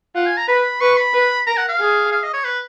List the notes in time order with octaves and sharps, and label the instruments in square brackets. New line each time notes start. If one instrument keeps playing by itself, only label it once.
[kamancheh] F4 [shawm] F#5
[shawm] G#5
A#5
[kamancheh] B4 [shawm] B5
[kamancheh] B4 [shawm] C#6
[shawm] B5
[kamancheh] B4
[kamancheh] A#4 [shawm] A#5
[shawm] F#5
F5
[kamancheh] G#4
[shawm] F5
D#5
C#5
B4